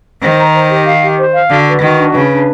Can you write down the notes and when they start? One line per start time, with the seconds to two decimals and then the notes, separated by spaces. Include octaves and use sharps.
0.22 D#3 C5
0.38 A#5
0.54 C5
0.70 G4
0.86 F5
1.02 G4
1.18 C5
1.34 F5
1.50 D3 F#4
1.67 B4
1.82 D#3 F#4
1.98 D4
2.14 C#3 B4
2.30 D4